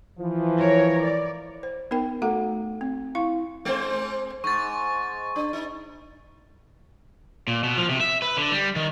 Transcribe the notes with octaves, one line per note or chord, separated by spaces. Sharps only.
E3 F3
A#4 C#5
D5
C5
B3 D#4 A#4 G5
A3 F#4 A4 F#5 A#5
C4
E4 F5 C#6
G#3 C4 C5
G#2 C#6 A6
D4
D#4
A#2
B2
F3
C3
E5
B4
D3
G3
D#3